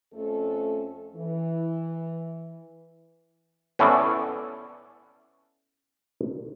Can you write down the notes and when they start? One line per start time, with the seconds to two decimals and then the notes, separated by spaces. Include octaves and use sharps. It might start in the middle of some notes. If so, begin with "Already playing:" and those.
0.14 F2 A3 C#4 A4
1.16 E3
3.79 B3 C#4 E4 A4 C#5 D5